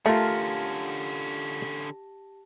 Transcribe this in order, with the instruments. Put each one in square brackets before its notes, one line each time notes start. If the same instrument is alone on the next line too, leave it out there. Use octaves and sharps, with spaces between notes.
[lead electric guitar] D3 C#4 [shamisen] A3 [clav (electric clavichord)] F4 A#4 [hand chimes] G4 A5 A#6